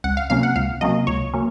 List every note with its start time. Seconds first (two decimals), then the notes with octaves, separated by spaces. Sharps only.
0.04 C#2 F#5
0.17 F5
0.30 C3 F#3 A#3 C#4 F5
0.43 F#5
0.56 C#2 F5
0.81 C3 F#3 A#3 C#4 D#5
1.07 C#2 C#5
1.34 F#3 A#3 C#4